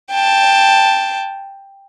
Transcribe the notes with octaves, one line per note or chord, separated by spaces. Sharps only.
G5 A5